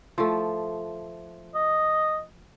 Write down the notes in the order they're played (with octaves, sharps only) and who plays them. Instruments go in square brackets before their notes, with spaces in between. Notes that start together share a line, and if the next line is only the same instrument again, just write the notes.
[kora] F3 A3
[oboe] D#5